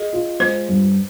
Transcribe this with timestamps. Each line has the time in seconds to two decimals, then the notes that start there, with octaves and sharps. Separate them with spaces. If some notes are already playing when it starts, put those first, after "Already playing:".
Already playing: G#4 D#5
0.13 F4
0.40 G#3 C5
0.69 G2